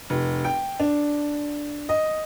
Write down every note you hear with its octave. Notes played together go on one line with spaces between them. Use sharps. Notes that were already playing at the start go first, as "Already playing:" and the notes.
F1
G5
D4
D#5